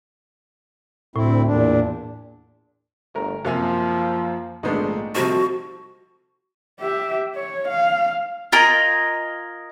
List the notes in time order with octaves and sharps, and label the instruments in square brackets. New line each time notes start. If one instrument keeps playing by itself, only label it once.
[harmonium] D2 C4 E4 [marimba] A2
[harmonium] E2 A#2 D4
[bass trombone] G1 [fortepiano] A3 A#4
[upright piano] F#2 A#3 G#5 [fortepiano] C3 [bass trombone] F3
[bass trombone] A#1 [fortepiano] G#2 B3 D4 [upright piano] D#3 G#3 A3
[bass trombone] C3 [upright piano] F3 A4 [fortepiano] G3 C4 D#4 [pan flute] F#4
[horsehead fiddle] G4 E5
C#5
F5
[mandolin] F4 A#4 D#5 G#5